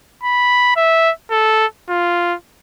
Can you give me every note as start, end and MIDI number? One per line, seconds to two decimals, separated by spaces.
0.23 0.74 83
0.76 1.11 76
1.31 1.66 69
1.89 2.35 65